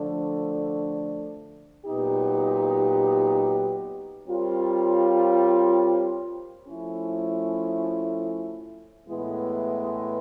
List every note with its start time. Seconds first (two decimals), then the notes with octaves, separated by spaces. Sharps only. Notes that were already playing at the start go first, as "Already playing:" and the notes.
Already playing: D3 F3 A3 D4
1.85 A#2 F#3 B3 D#4 G4
4.26 G3 C4 F4 A#4 C#5
6.67 F3 A3 C#4 E4
9.07 A2 E3 G#3 B3 E4